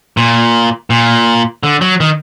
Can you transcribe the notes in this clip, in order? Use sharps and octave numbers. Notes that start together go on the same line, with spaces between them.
A#2
A#2
D3
F#3
D#3